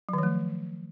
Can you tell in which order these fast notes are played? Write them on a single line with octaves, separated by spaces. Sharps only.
F#3 D#3 F3 A3